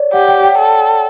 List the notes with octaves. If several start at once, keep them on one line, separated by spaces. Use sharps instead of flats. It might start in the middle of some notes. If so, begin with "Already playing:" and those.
Already playing: C#5 D5
G4 F#5
G5
G5
A4